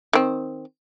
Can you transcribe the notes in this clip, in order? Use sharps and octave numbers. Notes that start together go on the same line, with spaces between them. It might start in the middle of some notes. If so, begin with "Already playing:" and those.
D#3 C4